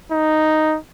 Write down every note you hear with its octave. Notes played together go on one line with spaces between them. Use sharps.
D#4